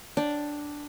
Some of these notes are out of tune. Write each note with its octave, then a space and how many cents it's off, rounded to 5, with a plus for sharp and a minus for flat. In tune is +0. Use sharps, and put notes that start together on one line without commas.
D4 +0 G5 +0